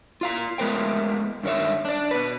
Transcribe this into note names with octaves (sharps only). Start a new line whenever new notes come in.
F4 F5 A#5
G#3 A3 B3 A#4 C5 G5
G2 D#3 C#4 C#5 E5
D4 D5
B2 B4